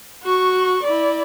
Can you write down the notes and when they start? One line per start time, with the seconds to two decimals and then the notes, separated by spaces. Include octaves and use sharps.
0.23 F#4 C#6
0.84 E4 D5